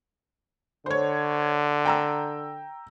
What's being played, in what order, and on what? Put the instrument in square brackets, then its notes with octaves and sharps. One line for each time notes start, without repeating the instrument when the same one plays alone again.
[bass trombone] D3 [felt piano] C5 C#5
[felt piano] G5 A#5 E6